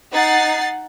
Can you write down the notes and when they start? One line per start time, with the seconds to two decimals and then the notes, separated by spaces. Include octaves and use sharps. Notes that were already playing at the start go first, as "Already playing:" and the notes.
0.11 D#4 F#5 A6 C7